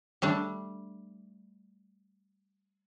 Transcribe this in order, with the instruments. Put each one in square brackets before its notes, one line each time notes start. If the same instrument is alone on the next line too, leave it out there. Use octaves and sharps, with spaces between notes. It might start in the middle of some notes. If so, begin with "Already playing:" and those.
[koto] G3 A3 D4